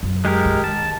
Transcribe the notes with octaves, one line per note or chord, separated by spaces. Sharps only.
F#2
G#3 G4 A#4
D#3
A5